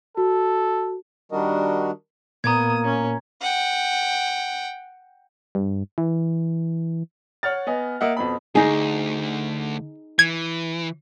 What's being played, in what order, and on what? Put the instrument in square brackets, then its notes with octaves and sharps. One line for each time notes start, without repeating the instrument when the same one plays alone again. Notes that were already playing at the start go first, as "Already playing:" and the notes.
[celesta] F#4 [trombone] A4
[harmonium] D#3 G3 D4 F#4 A#4 D#5
[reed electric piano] A#2 [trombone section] A#3 [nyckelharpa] B3 D#6 [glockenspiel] A#5 G#6
[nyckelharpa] C#4
[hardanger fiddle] F#5 G5
[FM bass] G2
E3
[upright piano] C#5 F#5 F6 A6
B3 D#5 G#5
A#3 D#5 E5 F#5
F2 B2 B5
[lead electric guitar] D2 [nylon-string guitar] D#4 G#4
[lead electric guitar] E3 [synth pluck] G#6